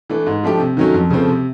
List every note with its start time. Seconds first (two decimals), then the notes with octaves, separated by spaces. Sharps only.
0.10 E3 A3 D4
0.26 G#2
0.43 F3 A3 D4 G4
0.60 C3
0.77 D#3 F#3 A3 C#4
0.94 F2
1.10 C#3 F3 A3 C4
1.28 C3